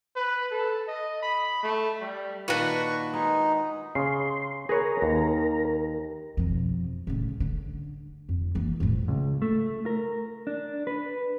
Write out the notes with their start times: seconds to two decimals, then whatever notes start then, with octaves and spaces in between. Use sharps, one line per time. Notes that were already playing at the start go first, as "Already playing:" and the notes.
0.16 B4
0.51 A4
0.88 D#5
1.23 B5
1.63 A3
2.01 G3
2.48 A#2 D#3 D4 F#4 B4 C#6
3.14 G#3 D#4
3.95 C#3 C6
4.69 G#4 A#4 B4 C#5 A#5
5.02 D#2
6.37 F2 B2
7.07 A2 C#3
7.40 D3
8.29 F2
8.55 E3 A#3
8.80 F2 A2
9.08 C#2
9.42 A3
9.86 A#4
10.47 D4
10.87 B4